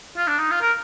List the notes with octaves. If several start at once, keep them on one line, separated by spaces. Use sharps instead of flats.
F4
D4
D#4
F4
A#4